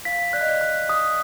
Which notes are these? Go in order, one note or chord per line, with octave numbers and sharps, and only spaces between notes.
F5 B6
D5 F#6
D#5
D5
F#6
D#6